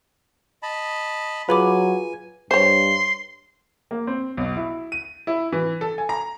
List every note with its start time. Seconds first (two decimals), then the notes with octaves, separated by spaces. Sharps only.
0.63 D#5 A5 B5
1.49 F#3 F4 G#4 B4 G#5 B5 D6
2.51 G2 C5 C#5 C6
3.91 A#3
4.07 C4
4.37 B1
4.56 E4
4.92 D#7
5.27 E4
5.52 E3
5.81 A4
5.98 G#5
6.09 A#5